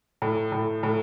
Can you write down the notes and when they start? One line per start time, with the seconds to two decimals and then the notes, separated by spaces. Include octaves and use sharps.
0.22 A2
0.52 A2
0.83 A2